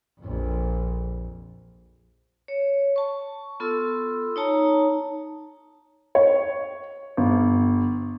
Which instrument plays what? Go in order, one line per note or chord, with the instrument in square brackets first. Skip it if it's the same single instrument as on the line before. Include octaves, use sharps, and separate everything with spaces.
[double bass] A#1 F2
[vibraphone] C#5
A5 C#6
B3 F4 A4 C6 E6
D#4 C#5 A5 A#5
[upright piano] C#5
G1